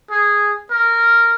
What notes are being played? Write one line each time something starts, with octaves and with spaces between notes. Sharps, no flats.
G#4
A#4